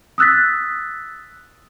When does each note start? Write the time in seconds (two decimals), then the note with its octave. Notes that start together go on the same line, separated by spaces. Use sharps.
0.18 D#6 E6 F#6 A6 B6